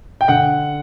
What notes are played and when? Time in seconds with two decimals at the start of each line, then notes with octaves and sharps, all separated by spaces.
0.21 G5
0.28 D3 F#5